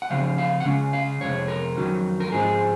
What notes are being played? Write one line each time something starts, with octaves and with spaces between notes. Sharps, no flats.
F#5
C#3 F3 C4 F5
F5
F#5
C#3 G#3 C#4 F5
F5
F2 C3 G#3 C#5
A#4
F2 D#3 F#3 C#4
A#4
G#2 F3 G#3 C4 G#4